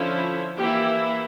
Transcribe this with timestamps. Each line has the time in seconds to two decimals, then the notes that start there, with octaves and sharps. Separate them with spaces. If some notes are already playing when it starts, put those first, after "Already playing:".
Already playing: D3 F3 C#4 E4
0.57 E3 A#3 E4 G4